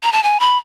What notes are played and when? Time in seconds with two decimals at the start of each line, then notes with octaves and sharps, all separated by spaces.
0.03 A#5
0.13 A5
0.23 G#5
0.40 B5